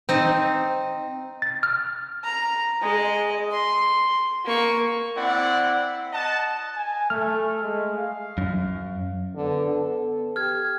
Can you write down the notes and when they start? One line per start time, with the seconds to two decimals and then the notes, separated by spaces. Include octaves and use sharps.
0.09 C4 D#4
1.42 A6
1.63 F6
2.24 A#5
2.82 G#3 D#5
3.52 C6
4.45 A#3 C#6
5.16 C4 E4 D5 F#5
6.13 D#5 F#5 A5
6.76 G#5
7.10 A3 F6
7.62 G#3
7.97 F5
8.38 F#2
9.35 D3 B3
9.66 A4
10.36 G4 F6 G#6